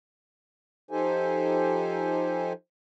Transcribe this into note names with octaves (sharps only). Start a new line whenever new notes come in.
F3 D#4 G4 A4 C5 G#5